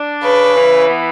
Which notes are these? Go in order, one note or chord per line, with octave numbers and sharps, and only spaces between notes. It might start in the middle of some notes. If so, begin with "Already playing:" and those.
Already playing: D4
C#3 B4
E3
B3